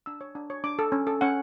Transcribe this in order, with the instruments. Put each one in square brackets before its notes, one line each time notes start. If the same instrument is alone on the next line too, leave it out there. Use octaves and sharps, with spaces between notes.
[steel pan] D4 E6
C#5
D4
C#5
D4 D6
A4
C#4
A4
C#4 F#5